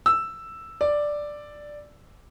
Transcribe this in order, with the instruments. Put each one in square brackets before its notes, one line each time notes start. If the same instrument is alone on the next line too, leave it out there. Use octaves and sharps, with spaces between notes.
[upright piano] E6
D5